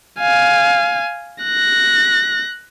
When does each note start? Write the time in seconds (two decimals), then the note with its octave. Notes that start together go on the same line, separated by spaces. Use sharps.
0.20 F5 G#5
1.44 F#6 A#6